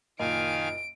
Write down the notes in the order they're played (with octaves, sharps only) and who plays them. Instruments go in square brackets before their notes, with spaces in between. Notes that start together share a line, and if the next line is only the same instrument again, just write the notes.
[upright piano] F#1 A#2 F6 [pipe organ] D#3 F5 G#5 [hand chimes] D#5 [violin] D7